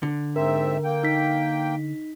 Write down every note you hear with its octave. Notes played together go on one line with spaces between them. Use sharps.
D3
G#2 C4 A#4 E5
A#3 G5
D#4 B6